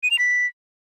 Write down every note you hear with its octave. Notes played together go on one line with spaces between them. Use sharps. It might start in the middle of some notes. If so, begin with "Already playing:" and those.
D#7
F7
B6